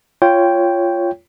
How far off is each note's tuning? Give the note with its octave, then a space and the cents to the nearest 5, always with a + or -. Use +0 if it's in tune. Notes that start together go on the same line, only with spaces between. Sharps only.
F4 -15 C#5 +5 G5 +0